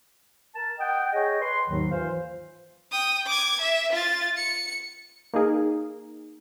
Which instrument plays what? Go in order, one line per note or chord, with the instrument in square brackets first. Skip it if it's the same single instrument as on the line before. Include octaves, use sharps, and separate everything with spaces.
[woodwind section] A#4 A5
D#5 F#5 G5
G#4 C#5 D#5 G5
B4 C6
D#2 G#2 D#3 F#3
E3 F4 C5 F5
[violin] G5 D#6
D6 G#6
E5
F4 A6
C#7
[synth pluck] A#3 D#4 G#4 A#4